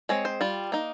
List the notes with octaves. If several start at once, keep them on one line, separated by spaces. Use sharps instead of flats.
G#3 C4 C#5
C5
G3 F4
A#3 D#4